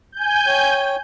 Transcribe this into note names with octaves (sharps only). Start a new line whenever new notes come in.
G#5 G6
C#5 G5